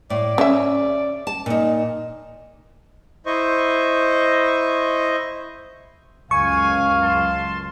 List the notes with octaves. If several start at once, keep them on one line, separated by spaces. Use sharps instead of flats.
A2 D5
C#3 C#4 E5
A5
A#2 D#4
E4 C5 D#5 C#6
C#2 F#2 F5 G#5 C#6
A5 C6